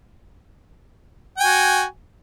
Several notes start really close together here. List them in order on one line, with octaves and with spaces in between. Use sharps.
G5 G#5 F#4